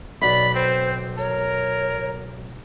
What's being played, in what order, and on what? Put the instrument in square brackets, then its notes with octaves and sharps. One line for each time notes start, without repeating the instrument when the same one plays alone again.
[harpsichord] B1 [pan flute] D5 [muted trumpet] B5
[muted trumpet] C4 [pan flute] C5
[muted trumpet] A#4 [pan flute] C#5